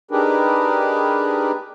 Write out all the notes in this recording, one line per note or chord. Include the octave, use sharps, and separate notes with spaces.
D4 D#4 G4 G#4 A#4 B4